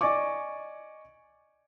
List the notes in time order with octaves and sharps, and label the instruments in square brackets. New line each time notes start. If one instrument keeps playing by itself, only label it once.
[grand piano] D5 D#5 G#5 C#6 D6